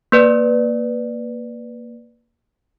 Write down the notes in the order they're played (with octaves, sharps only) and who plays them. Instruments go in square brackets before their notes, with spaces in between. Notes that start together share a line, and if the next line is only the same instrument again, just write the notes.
[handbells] A#3 B4 D5